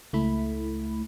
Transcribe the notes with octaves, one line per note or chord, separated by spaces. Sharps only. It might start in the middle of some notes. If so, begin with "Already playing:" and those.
C#2 A3 E4 B5